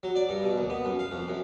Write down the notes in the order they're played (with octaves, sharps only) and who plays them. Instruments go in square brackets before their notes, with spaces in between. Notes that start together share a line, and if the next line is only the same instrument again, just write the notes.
[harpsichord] F#3
D5
G2
B2
D#2
B3
F#2
F5
F2
F#2